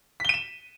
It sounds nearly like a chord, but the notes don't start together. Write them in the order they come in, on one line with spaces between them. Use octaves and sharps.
B6 G7 D#7 E7